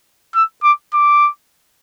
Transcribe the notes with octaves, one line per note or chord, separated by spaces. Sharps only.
E6
D6
D6